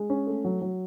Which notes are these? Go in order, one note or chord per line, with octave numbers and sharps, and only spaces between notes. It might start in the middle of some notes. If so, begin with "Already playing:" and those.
Already playing: G#3
C#4
A3
F#3
F#3